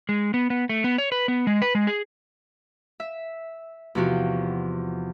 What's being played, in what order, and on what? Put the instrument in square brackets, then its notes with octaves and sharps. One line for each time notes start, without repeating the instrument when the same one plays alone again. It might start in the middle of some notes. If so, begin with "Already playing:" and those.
[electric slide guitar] G#3
B3
B3
A3
B3
C#5
B4
B3
G#3
B4
G#3
G#4
[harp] E5
E2 C3 F3 F#4 G4